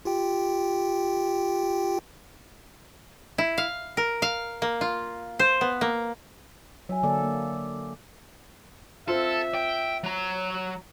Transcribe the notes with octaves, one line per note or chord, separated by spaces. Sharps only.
F4 G4 G5
E4
F5
A#4
F5
A#3
F4
C5
B3
A#3
F#3 E5 G#5
D3 A#3 A4 D5
A#3
C4 F4 A4 E5
G5
F#3 A#5